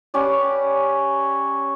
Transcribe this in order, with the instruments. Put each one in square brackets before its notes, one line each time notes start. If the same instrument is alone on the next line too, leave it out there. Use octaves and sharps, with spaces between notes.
[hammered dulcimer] C#4 G4 B4 D5